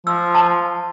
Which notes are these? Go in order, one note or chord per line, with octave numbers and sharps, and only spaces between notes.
F3 E6
A5